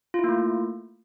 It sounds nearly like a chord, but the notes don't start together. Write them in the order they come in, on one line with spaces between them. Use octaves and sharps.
F4 E4 A#3 A3